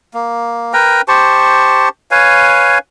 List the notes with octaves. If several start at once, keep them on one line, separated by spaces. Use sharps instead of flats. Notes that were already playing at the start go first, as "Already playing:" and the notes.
A#3
A#4 B4 G5 A#5
G4 C5 A5 C#6
B4 C#5 F5 G#5